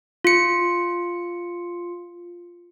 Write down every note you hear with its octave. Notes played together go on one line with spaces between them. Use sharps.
F4 C#7